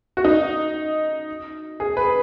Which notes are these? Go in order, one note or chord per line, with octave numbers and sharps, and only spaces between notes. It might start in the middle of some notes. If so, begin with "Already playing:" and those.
F#4
D#4
G#4
B4